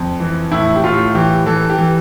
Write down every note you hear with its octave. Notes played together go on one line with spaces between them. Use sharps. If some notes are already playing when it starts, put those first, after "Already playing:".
Already playing: F2
E3
A2 E4
G4
A2 F4
E3 G4
E3 A4
G4
E3